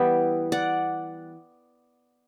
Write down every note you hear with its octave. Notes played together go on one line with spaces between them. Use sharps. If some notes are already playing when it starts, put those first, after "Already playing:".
Already playing: E3 G3 B3 E5 G5
D5 F#5